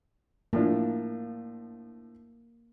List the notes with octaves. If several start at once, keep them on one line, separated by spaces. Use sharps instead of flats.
A2 F3 A#3 D4